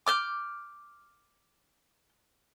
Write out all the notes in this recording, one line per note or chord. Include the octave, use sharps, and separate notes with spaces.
D6 F6 G6